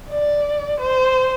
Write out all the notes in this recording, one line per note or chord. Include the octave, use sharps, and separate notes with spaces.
D5
C5